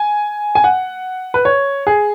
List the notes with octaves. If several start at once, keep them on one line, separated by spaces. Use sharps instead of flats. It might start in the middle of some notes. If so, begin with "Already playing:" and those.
Already playing: G#5
G#5
F#5
B4
C#5
G#4